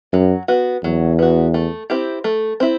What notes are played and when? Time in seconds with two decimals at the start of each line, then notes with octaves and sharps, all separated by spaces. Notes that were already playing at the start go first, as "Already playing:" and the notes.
0.13 F#2 F#3
0.48 B3 F#4
0.83 E2 F#3
1.19 B3 F#4
1.54 A3
1.90 C4 E4 G4
2.24 A3
2.60 C4 E4